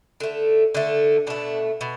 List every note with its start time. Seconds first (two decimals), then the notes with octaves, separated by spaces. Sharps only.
0.20 D3 A3
0.75 D3 A3
1.27 B2 A3 D4
1.81 B2